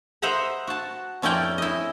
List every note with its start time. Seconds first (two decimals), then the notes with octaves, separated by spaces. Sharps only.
0.22 C5 D#5 E5 F#5 A#5 B5
0.67 F#4 A5
1.22 F2 C#4 E4 D5 G5 A#5
1.58 E4 D#5